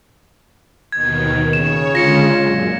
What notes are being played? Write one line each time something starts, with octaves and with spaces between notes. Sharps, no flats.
D#2 B2 D#3 G#6
C#3 C#5 E7
D3 G#3 C#4 F4 A#6 C#7
F#2 A#2